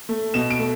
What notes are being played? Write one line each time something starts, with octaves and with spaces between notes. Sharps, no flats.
A3
B2 E7
D7
A3